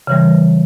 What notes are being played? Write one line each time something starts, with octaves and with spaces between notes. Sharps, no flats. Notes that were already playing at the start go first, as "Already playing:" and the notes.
C#3 E3 G3